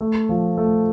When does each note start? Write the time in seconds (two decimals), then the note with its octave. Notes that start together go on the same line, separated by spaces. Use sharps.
0.01 A3
0.29 F3
0.57 A3